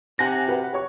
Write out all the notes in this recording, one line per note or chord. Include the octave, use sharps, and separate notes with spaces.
C3 F#5 G#5 F#6 A#6
F#4 B4 F#5
G4 C#5 C#6